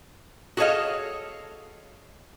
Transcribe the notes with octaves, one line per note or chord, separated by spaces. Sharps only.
F#4 G#4 A4 C#5 D#5 F5